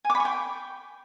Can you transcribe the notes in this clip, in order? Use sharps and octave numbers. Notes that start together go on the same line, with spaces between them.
G#5
D6
B5
C#6
G5